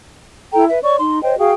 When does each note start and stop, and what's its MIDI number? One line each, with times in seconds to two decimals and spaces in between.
0.53 0.64 64
0.53 0.64 69
0.53 0.64 79
0.53 0.64 82
0.69 0.78 71
0.69 0.78 76
0.83 0.96 73
0.83 0.96 74
0.83 0.96 85
0.98 1.20 63
0.98 1.20 84
1.22 1.37 72
1.22 1.37 73
1.22 1.37 75
1.22 1.37 79
1.38 1.53 66
1.38 1.53 68
1.38 1.53 77
1.38 1.53 79